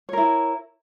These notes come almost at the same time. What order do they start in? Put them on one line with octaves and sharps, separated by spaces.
C#5 A#4 E4